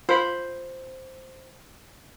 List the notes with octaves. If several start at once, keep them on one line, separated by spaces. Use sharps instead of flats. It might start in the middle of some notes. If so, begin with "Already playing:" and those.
F4 C5 B5